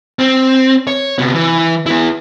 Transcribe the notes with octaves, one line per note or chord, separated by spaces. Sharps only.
C4
C#5
C3 B3
E3
B3 E4